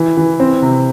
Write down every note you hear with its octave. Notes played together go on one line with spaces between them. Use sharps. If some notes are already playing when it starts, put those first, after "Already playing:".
Already playing: E3
E3
C4
C3